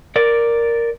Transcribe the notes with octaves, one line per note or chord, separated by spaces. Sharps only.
A#4 D5